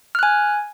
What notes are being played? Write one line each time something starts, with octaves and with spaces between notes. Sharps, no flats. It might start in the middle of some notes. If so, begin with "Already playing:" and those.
G#5 F6 F#6